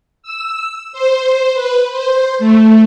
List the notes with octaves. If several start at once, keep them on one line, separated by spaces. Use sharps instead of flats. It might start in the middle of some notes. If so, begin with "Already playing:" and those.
E6
C5
B4
C5
A3